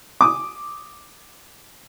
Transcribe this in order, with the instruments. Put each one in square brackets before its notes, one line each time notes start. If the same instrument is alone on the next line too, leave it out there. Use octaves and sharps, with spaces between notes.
[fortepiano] D6 D#6